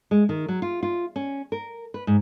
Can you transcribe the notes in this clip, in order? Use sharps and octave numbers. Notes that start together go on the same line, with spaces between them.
G#3
D#3
F#3
F4
F4
C#4
A#4
B4
G#2